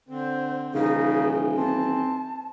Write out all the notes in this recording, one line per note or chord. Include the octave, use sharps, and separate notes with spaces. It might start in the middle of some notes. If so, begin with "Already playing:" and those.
D3 C4 C5
D#1 C#3 E3 D#4
C4 A5